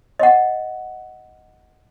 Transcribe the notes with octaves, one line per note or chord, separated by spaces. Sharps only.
D#5 F#5